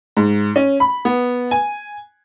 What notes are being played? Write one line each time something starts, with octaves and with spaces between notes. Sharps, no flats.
G#2
C#4
B5
B3
G#5